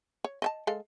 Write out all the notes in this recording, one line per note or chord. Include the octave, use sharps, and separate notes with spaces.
C#5
D#5 E5 A5
G#3 A4 F5